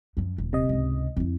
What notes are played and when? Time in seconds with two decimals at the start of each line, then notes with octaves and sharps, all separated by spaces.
0.17 F#2 F3
0.38 D#1
0.53 C3 D#5
0.69 C#2 G#2
1.17 F2 E4